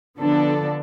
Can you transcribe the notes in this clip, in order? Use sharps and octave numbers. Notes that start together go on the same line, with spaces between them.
D3 F3 B3 D4 A4